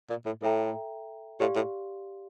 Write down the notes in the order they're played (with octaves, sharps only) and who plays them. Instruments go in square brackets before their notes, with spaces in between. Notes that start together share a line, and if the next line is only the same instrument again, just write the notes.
[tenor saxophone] A#2
A2
[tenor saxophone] A2 [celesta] A4 E5 G5 A#5
[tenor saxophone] A2 [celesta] G4 D5 F5 C6
[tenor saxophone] A2